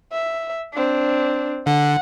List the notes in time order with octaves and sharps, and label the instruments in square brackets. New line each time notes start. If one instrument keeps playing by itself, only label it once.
[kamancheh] E5
C4 D4
[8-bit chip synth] D3 [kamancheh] F#5